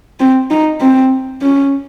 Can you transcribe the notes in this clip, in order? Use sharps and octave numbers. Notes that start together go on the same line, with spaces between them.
C4
D#4
C4
C#4